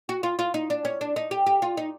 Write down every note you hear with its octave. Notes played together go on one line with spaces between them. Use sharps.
F#4
F4
F4
D#4
D4
C#4
D4
D#4
G4
G4
F4
D#4